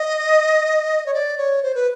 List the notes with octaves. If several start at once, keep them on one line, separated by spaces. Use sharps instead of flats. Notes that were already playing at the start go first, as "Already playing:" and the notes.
Already playing: D#5
C#5
D5
C#5
C5
B4